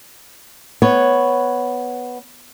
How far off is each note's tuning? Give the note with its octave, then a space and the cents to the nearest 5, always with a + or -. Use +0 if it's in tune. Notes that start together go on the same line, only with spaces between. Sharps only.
B3 +0 C#5 +0